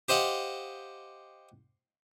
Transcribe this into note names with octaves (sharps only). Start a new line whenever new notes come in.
G4 C5 D#5 F5 F#5